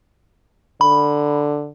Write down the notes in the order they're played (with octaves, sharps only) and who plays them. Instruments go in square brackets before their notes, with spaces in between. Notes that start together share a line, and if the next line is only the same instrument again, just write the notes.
[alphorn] D3 [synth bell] B5